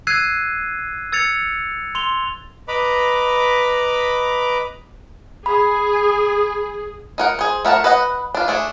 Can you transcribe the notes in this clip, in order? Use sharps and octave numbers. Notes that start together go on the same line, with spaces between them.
E6 F#6 G#6 C7 D#7
E6 G#6 A6 C#7 F7
C6 F7 G7
B4 D#5 A#5 B5 D6
G#4 B5
D#4 A#4 F#5
G#4 C5
A3 A#4 F#5 A5
B4 D#5 F#5
D4 F4
A3 D4 G#4